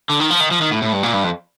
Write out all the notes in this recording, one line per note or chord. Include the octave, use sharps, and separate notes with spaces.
D3
D#3
F3
D#3
F3
D#3
A2
A2
G2
A#2
G2
F2